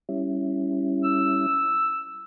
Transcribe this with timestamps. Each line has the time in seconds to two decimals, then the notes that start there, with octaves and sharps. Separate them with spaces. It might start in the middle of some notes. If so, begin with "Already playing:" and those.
0.09 G3 C#4 E4
1.04 E6